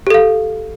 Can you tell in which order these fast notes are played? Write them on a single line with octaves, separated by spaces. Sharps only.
G4 A4 F5